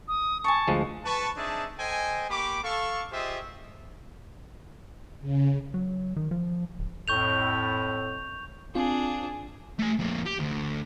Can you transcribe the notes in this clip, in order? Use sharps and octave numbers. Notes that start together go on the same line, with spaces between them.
D#6
G#5 A5 C#6
D2 F3 G#3
B4 A5 C#6
C4 D4 D#4 G#4 E5 A5
A4 C5 D#5 G5 G#5
A#3 G4 B5 C#6 D6
A4 F5 C#6
F4 G4 G#4 C5 D#5 E5
C#3
F#3
D#3
F3
D1
F2 A2 C#6 G6 F7
C4 D4 F4 G#4
A3 G#5
F2 A#3
G4
D2